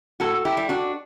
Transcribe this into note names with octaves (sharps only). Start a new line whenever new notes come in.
A2 F#4 A4
E4 G4
G3
D4 F#4